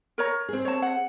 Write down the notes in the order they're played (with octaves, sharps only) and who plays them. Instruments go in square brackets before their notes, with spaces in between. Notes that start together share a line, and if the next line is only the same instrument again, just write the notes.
[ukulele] A#4 C#5 A#5
[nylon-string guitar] C4 G#4
[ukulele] C#5 A5
F#5